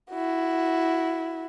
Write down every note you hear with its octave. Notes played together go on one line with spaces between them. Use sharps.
E4 F#4